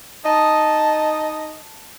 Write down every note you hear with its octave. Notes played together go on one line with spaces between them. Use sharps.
D#4 D#5 A5